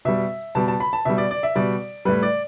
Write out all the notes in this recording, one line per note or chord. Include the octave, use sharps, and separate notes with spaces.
B2 G3 E5
B2 G3 A5
A5
B5
A5
B2 G3 E5
D5
D5
E5
B2 G3 D5
A2 G3 B4
D5